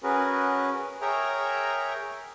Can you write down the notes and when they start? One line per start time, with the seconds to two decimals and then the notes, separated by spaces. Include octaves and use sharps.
0.03 C#4 F#4 G#4 A#4 B4
1.02 G#4 A#4 C#5 E5 G5 A#5